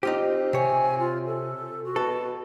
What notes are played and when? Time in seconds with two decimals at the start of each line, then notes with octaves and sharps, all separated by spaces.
0.03 C4 D#4 F4 G4
0.53 C3 C#5 G#5
0.99 F4
1.26 A4
1.84 F#4
1.96 B2 A4